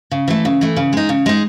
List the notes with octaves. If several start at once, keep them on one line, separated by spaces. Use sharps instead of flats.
C#3
E3 A3
C#3
E3 A3
C#3
G#3 D#4
C#3
G#3 D#4